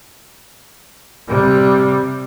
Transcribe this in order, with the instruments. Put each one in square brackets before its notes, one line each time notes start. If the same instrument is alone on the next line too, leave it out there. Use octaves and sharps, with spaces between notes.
[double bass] C3 G3